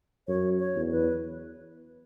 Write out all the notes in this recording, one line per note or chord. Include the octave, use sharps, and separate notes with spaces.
F#2 C#5
C#5
E2
B4